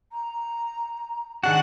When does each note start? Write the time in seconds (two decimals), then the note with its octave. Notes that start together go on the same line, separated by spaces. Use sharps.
0.12 A#5
1.43 D#3 D4 F#4 G#4 F#5